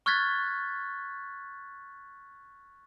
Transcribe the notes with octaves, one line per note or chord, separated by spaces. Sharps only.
C#6 F6 F#6 G#6 A6 B6